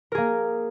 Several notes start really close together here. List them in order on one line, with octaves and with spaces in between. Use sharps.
A#4 G#4 A#3